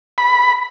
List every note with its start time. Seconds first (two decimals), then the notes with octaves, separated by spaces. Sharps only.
0.18 B5